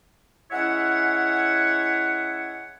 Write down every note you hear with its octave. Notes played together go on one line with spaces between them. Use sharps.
G#3 C#4 E4 C#5 E5 F#5